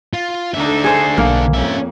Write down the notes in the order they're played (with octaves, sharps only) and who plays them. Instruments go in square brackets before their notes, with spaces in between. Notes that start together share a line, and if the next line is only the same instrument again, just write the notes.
[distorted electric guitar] F4
[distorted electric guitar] D3 E5 [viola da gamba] D4 D#4 A4
[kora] G#4 C5
[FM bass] B1 [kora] A#3
[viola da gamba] F2 [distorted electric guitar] C#4 E5